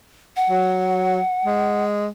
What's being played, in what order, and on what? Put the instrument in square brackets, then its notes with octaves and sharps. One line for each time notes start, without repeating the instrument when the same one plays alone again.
[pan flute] F#5
[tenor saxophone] F#3
G#3